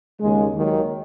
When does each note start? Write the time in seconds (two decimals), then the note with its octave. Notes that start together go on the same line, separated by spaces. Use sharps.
0.20 D#2 C#3 G#3
0.53 D#2 D#3 F#3